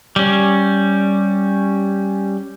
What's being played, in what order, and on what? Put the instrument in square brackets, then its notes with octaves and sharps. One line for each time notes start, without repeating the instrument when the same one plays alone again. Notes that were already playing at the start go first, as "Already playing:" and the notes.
[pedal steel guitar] G3 C#4